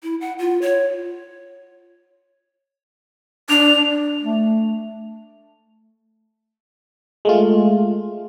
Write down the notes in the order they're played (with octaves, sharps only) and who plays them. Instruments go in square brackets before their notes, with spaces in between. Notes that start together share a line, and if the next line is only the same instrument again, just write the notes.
[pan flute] E4
F#5
F4
C#5
[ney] D4 [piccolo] F7
[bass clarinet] A3
[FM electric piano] G#3 A3 F4